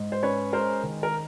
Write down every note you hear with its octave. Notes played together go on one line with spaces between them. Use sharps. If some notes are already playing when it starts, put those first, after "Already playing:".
Already playing: G#2
C5
C#4 B4 C#5
G#3 A#4 C5
D#3
A#4